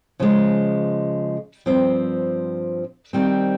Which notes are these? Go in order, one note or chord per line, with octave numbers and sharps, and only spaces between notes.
C#3 F3 G#3
G2 F3 C4
D#3 G3 C4